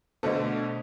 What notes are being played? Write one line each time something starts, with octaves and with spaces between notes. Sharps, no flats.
B2 D3 A3 A4 C5 D#5